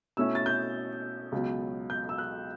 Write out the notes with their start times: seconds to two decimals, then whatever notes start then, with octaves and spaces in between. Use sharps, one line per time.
0.17 B2 A3 C#4 E4 E6
0.35 A6
0.46 G6
1.32 C#2 B2 F#3
1.90 G6
2.09 E6
2.18 F#6